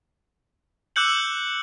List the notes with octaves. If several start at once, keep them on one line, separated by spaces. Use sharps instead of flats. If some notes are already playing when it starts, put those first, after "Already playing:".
D6 E6 F#6 G6 C#7 F#7